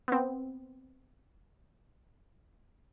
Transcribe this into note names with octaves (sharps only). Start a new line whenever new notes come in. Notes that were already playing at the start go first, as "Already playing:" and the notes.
B3 C4